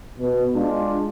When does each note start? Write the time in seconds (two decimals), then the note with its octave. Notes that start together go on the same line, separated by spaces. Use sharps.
0.19 B2
0.54 G#3 D4 F4